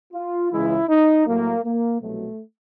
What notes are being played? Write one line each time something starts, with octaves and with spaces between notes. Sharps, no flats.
F4
C#2 C#3 E3 G#3 E4
D#4
A2 F#3 A#3
A#3
C2 B2 F#3 A3